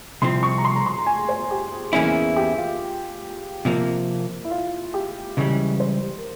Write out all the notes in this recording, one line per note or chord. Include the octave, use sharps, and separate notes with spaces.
C2 C3 F3 C4 C6
C#6
A#5
C6
A#5
C6
A#5
G#5
C5
G4
G#4
E2 E3 A#3 C#4 E4 G#4
G#4
G4
F4
C3 F3 A#3
E4
F4
G4
C#2 C#3 E3 G3
C5
A#4